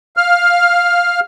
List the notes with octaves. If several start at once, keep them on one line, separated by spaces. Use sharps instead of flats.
F5 F6